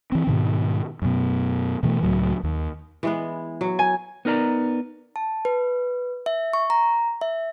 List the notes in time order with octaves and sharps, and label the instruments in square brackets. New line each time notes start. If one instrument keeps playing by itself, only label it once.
[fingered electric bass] E3 C4
G#2 B2 D#3
F#2 B2
B2 E3 G#3 A3
C#2 A2 F#3
D#2
[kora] E3 G#3 B3
F#3
[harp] G#5
[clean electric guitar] B3 D#4 A#4 D5 A#5
[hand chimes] A5
B4
E5
C#6
A#5
E5